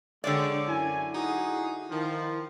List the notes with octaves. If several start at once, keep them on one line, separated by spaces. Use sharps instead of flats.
D3 G#3 G4 C#5 D5
F#2 E4 G#5
D#4 F#4 G#4
D#3 F3